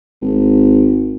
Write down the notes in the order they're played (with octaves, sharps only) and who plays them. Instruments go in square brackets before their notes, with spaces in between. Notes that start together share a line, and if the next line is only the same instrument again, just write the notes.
[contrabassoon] G#1